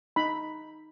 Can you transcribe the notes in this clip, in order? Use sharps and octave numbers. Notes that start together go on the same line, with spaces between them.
D#4 B5